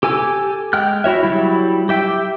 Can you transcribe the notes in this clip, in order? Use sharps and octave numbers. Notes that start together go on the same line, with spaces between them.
G4 A4 G#5 D6 E6
G#3 G5 F6 F#6
E4 F#4 C#5 E5
F#3 G3 E4
G4 E5 G5